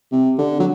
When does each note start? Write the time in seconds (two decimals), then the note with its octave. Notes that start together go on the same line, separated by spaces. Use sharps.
0.12 C3
0.38 D3
0.60 F#3